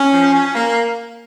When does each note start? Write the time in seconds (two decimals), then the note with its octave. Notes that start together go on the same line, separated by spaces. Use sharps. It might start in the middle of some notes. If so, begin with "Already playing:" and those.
Already playing: C#4
0.13 F3
0.33 C#4
0.55 A#3